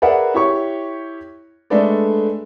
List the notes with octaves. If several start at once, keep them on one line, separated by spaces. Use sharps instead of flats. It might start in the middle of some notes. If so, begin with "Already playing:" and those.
G#4 A#4 B4 D5 E5 F#5
E4 G4 C#5 C#6
G#3 A3 D4 A4 B4 D5